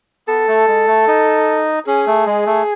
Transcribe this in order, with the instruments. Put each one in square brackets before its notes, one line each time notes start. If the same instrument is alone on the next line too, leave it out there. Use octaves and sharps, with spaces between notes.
[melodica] B3 [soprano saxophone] A4
[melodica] A3
G#3
A3
D#4
[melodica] C#4 [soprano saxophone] G#4
[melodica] A3
G#3
A3